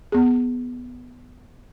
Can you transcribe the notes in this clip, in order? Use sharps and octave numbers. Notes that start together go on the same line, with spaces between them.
B3 G#4